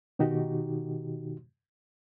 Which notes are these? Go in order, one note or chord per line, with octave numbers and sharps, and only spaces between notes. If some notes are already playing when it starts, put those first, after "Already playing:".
B2 D#3 D#4 F#4 G4